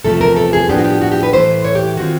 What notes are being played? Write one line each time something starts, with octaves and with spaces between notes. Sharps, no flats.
E2 C3 F3 A3 A4
A#4
A4
G#4
A2 F3 G#3 B3 D4 G4
F#4
G4
F#4
G4
B4
A2 E3 A3 C5
C#5
G4
D#3 G#3 C4 F4 F#4